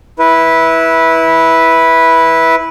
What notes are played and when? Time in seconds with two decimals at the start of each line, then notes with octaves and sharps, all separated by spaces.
0.19 E4 B4